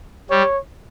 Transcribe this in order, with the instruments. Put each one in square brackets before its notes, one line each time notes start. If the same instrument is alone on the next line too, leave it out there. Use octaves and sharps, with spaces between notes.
[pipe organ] G3 [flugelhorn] C#5